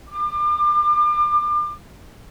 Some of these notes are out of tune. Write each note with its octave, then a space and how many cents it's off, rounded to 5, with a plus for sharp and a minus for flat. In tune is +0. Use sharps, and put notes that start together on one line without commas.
D6 +35